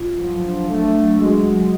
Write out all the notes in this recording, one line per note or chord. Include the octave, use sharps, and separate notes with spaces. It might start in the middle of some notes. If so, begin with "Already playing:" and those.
Already playing: F4
F3 F#3
D4
A3 D4
F#3
G#3 F#4
F#3